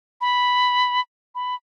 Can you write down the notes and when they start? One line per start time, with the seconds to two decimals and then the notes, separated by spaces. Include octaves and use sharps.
0.21 B5
1.35 B5